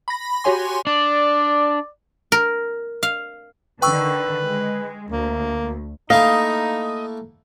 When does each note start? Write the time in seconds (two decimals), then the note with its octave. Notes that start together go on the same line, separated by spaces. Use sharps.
0.08 B5 A#6
0.44 F#4 G4 C#5 G#5 C6
0.87 D4 D5
2.32 A#4
3.03 F5
3.82 D3 D#3 B4 G5 C#6 E6
4.46 G#3
5.12 D2 A#3
6.10 A3 A#3 D#4 E4 D#5 F5